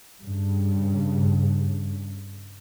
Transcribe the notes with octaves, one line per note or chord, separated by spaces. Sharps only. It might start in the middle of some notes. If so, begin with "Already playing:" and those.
G2 C#3